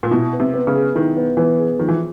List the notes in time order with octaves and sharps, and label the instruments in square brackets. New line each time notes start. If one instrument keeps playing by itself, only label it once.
[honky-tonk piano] A#2
[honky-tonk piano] B2 [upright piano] E4
[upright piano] B3
[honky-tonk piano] C3
[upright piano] B3
[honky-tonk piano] C#3
[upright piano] G#4
[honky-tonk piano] D#3 [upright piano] E4
[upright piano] B3
[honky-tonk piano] E3 [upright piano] B3
[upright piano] G#4
[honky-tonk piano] D#3 [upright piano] F3
[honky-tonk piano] E3